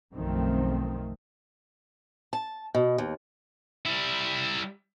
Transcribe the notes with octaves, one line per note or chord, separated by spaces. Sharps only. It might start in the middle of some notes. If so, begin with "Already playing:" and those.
B1 F#2 D#3 F3 A3 C4
A5
B2
D#2
G3 E4